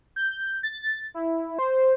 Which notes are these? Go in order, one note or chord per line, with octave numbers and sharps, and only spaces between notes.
G6
A6
E4
C5